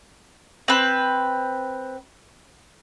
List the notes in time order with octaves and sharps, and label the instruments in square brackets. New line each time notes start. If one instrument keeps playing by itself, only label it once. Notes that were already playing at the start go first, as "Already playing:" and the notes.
[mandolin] C4 B4